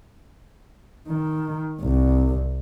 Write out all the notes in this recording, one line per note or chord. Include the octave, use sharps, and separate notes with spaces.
D#3
C2